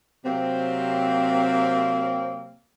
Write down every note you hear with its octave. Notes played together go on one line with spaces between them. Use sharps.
C3 F#3 A#3 C4